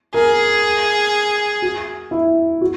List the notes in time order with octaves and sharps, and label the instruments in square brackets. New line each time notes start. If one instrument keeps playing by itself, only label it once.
[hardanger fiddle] G#4 [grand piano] A#4
[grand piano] F#4
E4
F#4